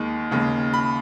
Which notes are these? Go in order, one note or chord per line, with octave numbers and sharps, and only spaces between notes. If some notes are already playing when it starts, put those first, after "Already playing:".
Already playing: D#2 D#3 G#3
D#2 C#3 G#3
B5